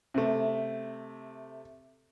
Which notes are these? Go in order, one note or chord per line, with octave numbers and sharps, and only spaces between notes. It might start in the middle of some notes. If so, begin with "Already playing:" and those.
C3 A3